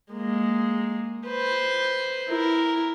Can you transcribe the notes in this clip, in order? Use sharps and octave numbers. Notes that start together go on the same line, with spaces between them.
G#3 A#3
B4 C5
E4 A#4